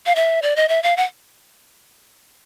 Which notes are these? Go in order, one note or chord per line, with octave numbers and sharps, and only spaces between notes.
F5
E5
D5
D#5
E5
F5
F#5